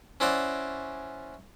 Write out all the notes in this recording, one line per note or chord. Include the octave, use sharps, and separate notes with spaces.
C#4 E4 C5 D5 F#5 A#5